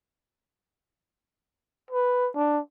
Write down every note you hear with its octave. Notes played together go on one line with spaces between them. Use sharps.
B4
D4